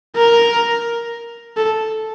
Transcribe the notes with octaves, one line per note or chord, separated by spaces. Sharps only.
A#4
A4